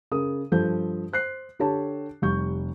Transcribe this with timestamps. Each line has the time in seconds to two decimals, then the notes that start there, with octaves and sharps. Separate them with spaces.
0.12 C#3 A#4 D#6
0.52 G2 F3 A4 G6
1.13 C5 F#6 C7
1.59 D3 G4 A4 C#5 A5
2.22 F1 G3 C#6 G6